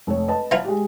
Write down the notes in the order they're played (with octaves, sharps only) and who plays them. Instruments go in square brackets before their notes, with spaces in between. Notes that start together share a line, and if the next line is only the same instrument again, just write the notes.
[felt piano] F1 A3 C#5
B4 D#5 A5
[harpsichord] E3 F#3 F4
[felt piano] G#3 G4